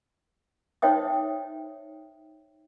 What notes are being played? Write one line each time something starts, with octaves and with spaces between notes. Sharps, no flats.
D#4 C5 C#5 E5 G5 D#6